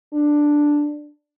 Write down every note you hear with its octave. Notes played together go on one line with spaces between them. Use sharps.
D4